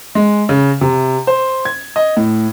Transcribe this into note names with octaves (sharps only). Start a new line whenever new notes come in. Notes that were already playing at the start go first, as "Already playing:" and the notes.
G#3
C#3
C3
C5
G#6
D#5
A2